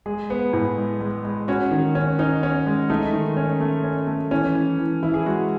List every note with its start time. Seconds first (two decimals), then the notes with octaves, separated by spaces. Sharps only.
0.06 G#3 G#4
0.30 B3
0.53 A2
0.78 G#3
1.01 G#3
1.25 G#3
1.48 C#4 F#4
1.71 D#3
1.95 C#4
2.19 C#4 D#4
2.43 C#4
2.66 G#3
2.90 A3 D#4
3.13 D#3
3.37 C#4
3.61 A3
3.84 C#4
4.07 A3
4.31 E3 C#4
4.55 E3
4.78 E3
5.03 E3 E4
5.14 G#4
5.26 G#3 F#4